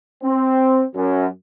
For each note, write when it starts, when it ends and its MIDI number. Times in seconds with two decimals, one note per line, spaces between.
0.23 0.85 60
0.95 1.26 42